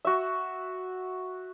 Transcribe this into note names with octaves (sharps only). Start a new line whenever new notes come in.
F#4 E5